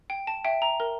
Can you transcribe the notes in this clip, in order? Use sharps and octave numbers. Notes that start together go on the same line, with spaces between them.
G5
A5
E5 G5
A#5
A#4